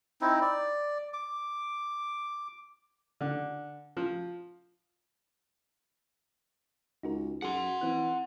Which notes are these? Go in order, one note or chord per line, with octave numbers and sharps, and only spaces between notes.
C4 D#4 E4
D5
D6
D3
F3
C#2 D#4 F#4 A#4
F#2 G#4 F#5 C6
E3 C4 F#6